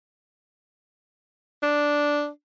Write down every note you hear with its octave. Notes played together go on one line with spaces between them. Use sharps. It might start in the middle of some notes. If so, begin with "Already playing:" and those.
D4